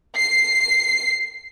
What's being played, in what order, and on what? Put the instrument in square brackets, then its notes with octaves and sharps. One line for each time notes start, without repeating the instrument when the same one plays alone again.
[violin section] C7